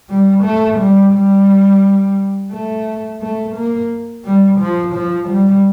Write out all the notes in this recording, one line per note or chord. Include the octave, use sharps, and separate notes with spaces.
G3
A3
G3
G3
A3
A3
A#3
G3
F3
F3
G3